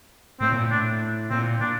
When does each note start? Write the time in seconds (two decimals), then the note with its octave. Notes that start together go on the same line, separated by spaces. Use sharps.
0.40 A2 C4
0.52 A#2
0.66 A2
0.71 D4
1.30 A#2 C4
1.60 A#2 D4